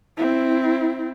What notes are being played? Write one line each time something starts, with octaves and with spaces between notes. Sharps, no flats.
C4 E4